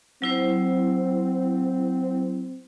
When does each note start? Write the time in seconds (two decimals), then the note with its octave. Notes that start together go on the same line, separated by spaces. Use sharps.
0.22 F#3 C4 E4 C5